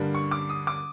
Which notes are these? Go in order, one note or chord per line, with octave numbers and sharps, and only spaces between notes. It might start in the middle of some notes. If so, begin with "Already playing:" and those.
Already playing: G2 D3 G3 A#3
C#6
D6
D#6
D6